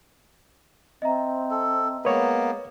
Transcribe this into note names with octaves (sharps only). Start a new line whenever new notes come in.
C4 D#5 E5 A#5
A4
G#3 A#3 B3 B4 C#5